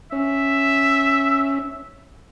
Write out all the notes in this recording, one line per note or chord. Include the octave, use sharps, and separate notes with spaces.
C#4 E5